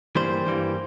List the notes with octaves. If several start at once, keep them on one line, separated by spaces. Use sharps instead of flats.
G2 E3 G3 A#3 C5
G2 E3 G3 A#3